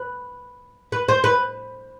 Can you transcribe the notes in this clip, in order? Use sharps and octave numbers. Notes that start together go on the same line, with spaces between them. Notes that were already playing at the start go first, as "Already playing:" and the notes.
Already playing: B4
B4
C5
B4